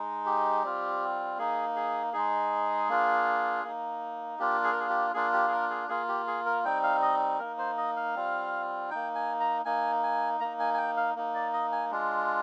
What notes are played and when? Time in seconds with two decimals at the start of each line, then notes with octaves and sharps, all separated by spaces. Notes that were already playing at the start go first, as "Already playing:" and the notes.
Already playing: G#3 D#4
0.26 G4
0.63 G3 C4 F4
1.38 A#3 D#4 G#4
1.76 G#4
2.13 G#3 D#4 G#4
2.89 A#3 D4 F4
3.64 A#3 D#4
4.39 A#3 D4 F4 G4
4.64 G#4
4.72 A#4
4.80 G#4
4.89 G4
5.14 A#3 D4 F4 G#4
5.33 G4
5.48 G#4
5.52 A#4
5.70 G#4
5.89 A#3 F4 G#4
6.08 G4
6.27 G#4
6.46 A#4
6.65 G3 C4 D#4 G5
6.83 F5
7.02 D#5
7.39 A#3 D#4 A#4
7.58 C5
7.78 D#5
7.96 F5
8.15 G3 C4 F4
8.90 A#3 D#4 G5
9.15 G#5
9.40 A#5
9.65 A#3 D#4 G#5
10.03 G#5
10.40 A#3 D#4 A#5
10.60 G#5
10.74 G#5
10.78 G5
10.97 F5
11.16 A#3 D#4
11.35 D5
11.53 D#5
11.72 G#5
11.91 G#3 D4 F4